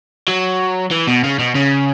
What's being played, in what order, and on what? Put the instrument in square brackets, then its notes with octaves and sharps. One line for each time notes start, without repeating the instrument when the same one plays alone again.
[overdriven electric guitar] F#3
E3
B2
C#3
B2
C#3